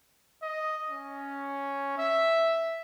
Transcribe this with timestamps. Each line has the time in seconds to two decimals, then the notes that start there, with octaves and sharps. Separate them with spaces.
0.42 D#5
0.90 C#4
1.98 E5